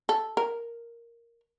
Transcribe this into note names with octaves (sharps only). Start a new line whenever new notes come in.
A4
A#4